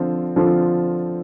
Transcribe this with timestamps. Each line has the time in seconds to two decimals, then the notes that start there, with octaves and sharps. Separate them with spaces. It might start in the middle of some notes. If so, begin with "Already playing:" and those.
Already playing: D3 F3 C4 F4
0.36 D3 F3 C4 F4 A4